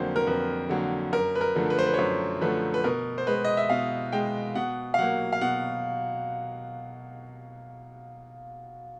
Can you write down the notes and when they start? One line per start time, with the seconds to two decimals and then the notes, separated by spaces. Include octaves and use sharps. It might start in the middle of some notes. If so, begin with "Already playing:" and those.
Already playing: F2 D3 F#3 A#3 C5
0.16 A#4
0.27 F2 B4
0.69 D3 F#3 A#3
1.13 F#2 A#4
1.35 B4
1.41 A#4
1.55 D3 F3 A3
1.70 B4
1.79 C5
1.86 B4
1.94 C#5
1.99 F#2 C5
2.41 D3 F3 A3 B4
2.74 B4
2.84 B2 A#4
3.18 C5
3.27 G#3 B4
3.45 D#5
3.57 E5
3.70 B2 F5
4.13 G#3 G5
4.55 B2 F#5
4.94 F5
4.98 F#3 A#3 F#5
5.32 F5
5.41 B2 F#5